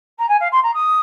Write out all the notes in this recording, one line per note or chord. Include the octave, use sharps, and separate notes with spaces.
A#5
G#5
F5
C6
A#5
D#6